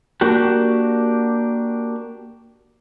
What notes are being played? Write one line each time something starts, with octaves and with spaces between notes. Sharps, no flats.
A#3 D4 F#4 G4